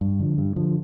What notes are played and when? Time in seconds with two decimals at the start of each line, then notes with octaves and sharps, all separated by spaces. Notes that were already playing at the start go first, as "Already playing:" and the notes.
0.01 G2
0.20 D3 F3
0.38 G2
0.56 D3 F3